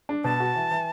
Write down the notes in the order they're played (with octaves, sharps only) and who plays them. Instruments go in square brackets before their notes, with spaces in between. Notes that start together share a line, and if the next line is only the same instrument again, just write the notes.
[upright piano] D4
[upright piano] B2 [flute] A5
[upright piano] F#4
E3
E3